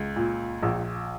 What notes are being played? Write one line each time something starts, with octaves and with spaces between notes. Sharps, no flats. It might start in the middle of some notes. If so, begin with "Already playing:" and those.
Already playing: C#2
A#2
A#1